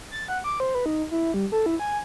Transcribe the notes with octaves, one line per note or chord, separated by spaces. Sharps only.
A6
F#5
D6
C5
B4
D#4
E4
G3
A4
E4
G#5